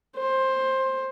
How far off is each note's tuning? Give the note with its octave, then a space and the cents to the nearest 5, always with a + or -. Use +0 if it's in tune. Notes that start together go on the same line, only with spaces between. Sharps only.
C5 +15